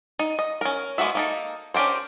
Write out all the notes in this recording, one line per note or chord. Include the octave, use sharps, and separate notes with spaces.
D#4
D#5
C#4 A#4
G#3 A#3 B3 F#4 E5
A#3 D#4 A4
C#4 D4 G4 A#4 C5